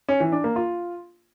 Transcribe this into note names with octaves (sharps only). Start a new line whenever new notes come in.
C#4
E3
D4
A#3
F4